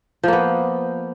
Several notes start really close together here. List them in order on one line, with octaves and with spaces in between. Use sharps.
F3 A#3 B3